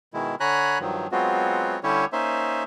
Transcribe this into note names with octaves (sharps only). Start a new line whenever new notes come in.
B2 D#3 G#3 E4
D3 C#5 G#5 A#5 B5 F#6
G2 D#3 F3 F#3
F#3 G#3 B3 C4 F4 F#4
D3 G3 C#4 E4 G4 C#5
A#3 C#4 D#4 C5 E5